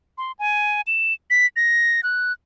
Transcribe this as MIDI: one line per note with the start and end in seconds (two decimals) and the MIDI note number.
0.18 0.32 84
0.39 0.81 80
0.87 1.13 100
1.30 1.46 95
1.56 2.01 94
2.03 2.32 90